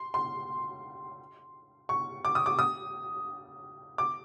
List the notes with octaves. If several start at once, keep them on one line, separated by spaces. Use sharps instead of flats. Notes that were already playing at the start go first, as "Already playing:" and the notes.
Already playing: C6
C6
C#6
D6
D#6
D6
D#6
D6